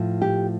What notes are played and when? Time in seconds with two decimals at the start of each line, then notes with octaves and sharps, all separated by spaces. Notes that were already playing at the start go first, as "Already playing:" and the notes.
Already playing: A2 F3
0.22 G4